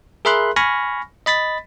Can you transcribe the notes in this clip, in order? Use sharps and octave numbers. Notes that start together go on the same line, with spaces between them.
G#4 A#4 E5 B5 C6 F#6
G#5 B5 C#6 F6 A#6
D#5 B5 A6 B6